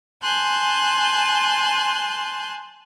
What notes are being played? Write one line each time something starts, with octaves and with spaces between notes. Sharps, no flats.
G#5 A5 C6 F#6 G6